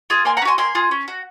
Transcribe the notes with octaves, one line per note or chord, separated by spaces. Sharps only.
F4 G#4
A#3 G#5 C6
F#5 A#5
C#4
F#4 G#5 C6
A#3 G#5 C6
F4 G#4
C#4
F#4